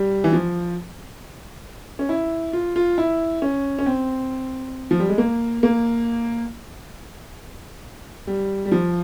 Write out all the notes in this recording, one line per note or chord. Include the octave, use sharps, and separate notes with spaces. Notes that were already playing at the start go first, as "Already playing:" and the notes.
Already playing: G3
E3
F3
C#4
E4
F4
F4
E4
C#4
C#4
C4
F3
G3
G#3
A#3
A#3
G3
G3
F3